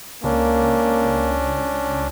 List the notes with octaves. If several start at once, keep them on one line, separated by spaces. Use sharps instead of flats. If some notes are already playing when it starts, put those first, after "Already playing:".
C#2 A#3 C#4 D4